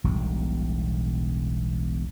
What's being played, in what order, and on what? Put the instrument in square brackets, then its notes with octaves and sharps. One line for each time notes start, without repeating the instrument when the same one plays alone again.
[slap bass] E1 B1 A2 G3